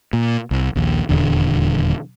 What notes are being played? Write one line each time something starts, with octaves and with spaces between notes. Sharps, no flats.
A#2
C2
A#1 D#2
D#1 E2 D3